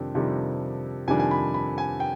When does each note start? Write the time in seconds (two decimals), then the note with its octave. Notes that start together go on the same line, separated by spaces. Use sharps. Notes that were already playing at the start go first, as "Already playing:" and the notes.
Already playing: F2 C3 D#3 G3 D4 G5
0.15 F2 C3 D#3 G3 D4
1.08 F2 C3 D#3 G3 D4 G#5
1.20 G#5
1.31 B5
1.54 B5
1.78 G#5
2.00 G5